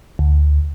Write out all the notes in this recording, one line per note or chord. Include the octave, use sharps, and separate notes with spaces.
D2